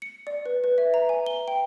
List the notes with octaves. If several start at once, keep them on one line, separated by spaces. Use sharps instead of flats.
C#7
D5
B4
B4
E5
A#5
G#5
G7
G5